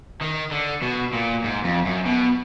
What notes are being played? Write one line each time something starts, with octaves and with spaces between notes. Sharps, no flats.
D#3
D3
B2
A#2
G#2
F2
F#2
B2